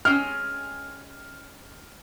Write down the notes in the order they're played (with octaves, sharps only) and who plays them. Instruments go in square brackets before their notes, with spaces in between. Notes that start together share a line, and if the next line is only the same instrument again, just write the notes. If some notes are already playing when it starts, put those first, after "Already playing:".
[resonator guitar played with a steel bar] G#3 C4 C#4 [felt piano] F6